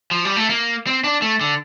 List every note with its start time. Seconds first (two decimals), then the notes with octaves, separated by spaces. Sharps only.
0.11 F3
0.25 G3
0.36 A3
0.50 A#3
0.87 C4
1.04 D4
1.22 A3
1.41 D3